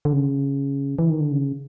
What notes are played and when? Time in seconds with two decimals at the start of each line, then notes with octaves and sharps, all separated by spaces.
0.05 D3
0.13 C#3
0.99 E3
1.10 D#3
1.20 D3
1.31 C#3